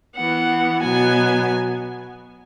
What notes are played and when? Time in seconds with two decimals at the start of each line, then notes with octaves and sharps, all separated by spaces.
0.16 E3 B3 F#5
0.82 B2 F#3 B3 G#5